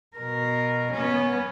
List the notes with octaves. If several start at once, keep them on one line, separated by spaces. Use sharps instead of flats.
B2 A#4
B3 C#4